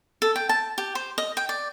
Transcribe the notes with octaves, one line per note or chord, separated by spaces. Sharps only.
A4
G5
A5
G4
C5
D#5
G5
D5